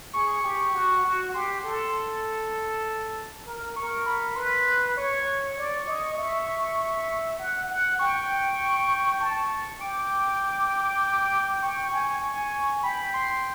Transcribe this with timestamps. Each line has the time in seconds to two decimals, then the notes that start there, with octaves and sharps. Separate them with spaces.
0.13 G#4 C#6
0.43 G4
0.74 F#4
1.04 F#4
1.34 G4 C6
1.64 A4
3.46 A#4
3.76 A#4 C#6
4.06 B5
4.36 B4 C6
4.97 C#5 C#6
5.57 D5
5.87 D#5
6.17 E5
7.39 F#5
7.70 F#5
7.99 G5 C#6
9.20 A5 C#6
9.80 G5 D6
11.62 G5 C#6
11.93 G#5
12.23 G#5
12.83 G5 B5
13.14 C6